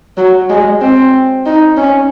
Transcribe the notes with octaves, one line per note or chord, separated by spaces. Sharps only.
F#3
G#3
C4
D#4
C#4